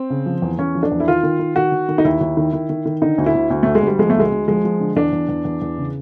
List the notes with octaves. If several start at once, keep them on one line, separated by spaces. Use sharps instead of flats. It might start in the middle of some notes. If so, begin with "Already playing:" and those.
Already playing: C4
C#3
F3
E2
E2 C#4
F3
D4
E2
E4
D#3 F4
D#3
D#3
D#3 F#4
D#3
D#3
D#4
D#2 E4
D#2
D#3
D#3
D#3
D#3
D3 D#4
D2
E4
D2
D2
D2 A3
G#3
D2 G3
F3 G#3
A3
D2 G#3
D2
F3 G#3
F3
D3
E2 D4
E2
E2
E2
E2
C#3